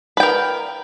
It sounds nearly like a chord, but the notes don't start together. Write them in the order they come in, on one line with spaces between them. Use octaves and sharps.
B4 G5 A#4